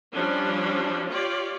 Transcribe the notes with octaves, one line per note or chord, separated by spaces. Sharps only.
F3 G3 C#4 D4
F4 G4 C#5 D5